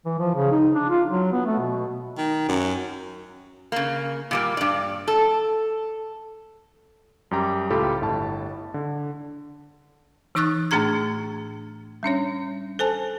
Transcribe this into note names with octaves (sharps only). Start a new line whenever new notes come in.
E3
F3
C#3
D#4
D4
F4
F#3
B3
A3
B2
D#3
F#2
C#3 A#3
A#2 G3 A#3
G2 D5
A4
F#2 G3 G4 A#5
C#2 A2 F4 G4 A4 B5
G1 A2 A5
D3
E3 D#4 C#6 D#6 F#6 A6
A2 A3 D4 G#4 A#5 G#6
G3 C#4 D4 C#5
A4 C5 G#5 A5